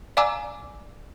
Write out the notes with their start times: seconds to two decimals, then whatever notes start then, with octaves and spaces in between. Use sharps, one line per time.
0.17 D5 F5 G#5 A#5 D6 E6